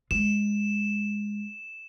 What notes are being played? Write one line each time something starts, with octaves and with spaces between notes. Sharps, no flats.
G#3 E7